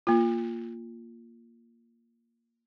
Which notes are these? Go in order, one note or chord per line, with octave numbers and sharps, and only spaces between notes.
A#3 F4